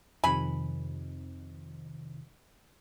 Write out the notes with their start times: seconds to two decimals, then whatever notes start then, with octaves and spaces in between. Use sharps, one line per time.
0.24 F2 C3 D#3 G#5 B5